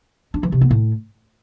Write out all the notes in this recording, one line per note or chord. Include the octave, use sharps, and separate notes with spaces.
D4
E3
C3
B3
A2